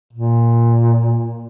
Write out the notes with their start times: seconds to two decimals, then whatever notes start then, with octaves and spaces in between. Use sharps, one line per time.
0.13 A#2